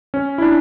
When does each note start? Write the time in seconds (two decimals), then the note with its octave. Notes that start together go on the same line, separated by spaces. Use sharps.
0.14 C#4
0.38 E4
0.42 D4